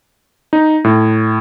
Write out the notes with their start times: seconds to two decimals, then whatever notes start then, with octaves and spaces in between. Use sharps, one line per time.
0.53 D#4
0.84 A2